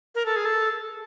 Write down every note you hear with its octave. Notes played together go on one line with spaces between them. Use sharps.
A#4
A4
G#4
A4